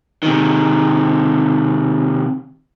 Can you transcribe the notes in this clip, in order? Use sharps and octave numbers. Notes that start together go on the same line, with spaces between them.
C3 D#3